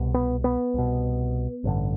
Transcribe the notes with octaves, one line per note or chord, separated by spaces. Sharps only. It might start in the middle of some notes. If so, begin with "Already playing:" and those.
Already playing: C2 B2
B3
B3
C2 B2
A1 G2 D3